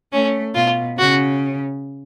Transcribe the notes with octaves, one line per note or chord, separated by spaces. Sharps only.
A3 C#4
B2 F4
C#3 F#4